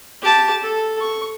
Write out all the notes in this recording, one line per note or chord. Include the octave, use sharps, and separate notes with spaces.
G4 A5
A4
C#6